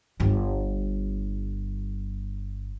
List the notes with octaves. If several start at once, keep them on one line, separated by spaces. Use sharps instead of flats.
G1 G3